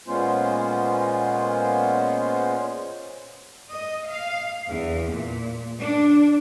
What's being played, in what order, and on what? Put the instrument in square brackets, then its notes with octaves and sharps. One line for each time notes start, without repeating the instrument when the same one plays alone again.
[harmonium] A#2 G#3 B3 C#4 F4 C5
[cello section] D#5
F5
E2
A#2
D4